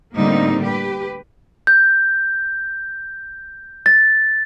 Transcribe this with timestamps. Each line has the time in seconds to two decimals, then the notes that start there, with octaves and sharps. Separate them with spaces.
0.16 A2 D3 G3 A#3 C4 D#4
0.63 G4 B4
1.67 G6
3.86 A6